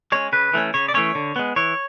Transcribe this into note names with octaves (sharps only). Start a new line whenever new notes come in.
G#3 C#4 C#5
C#3 B4
E3 A3 C#4
C#3 C#5
D5
E3 A3 C#4 C#5
D3
G#3 B3
E3 C#5